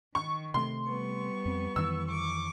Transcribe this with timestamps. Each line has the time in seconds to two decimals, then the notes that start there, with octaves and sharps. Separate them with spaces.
0.15 D#3 C#6
0.54 C3 A3 C6
0.89 G3 B3 C#6
1.45 F2 C4
1.76 F2 D#3 E3 E6
2.08 C#6 D6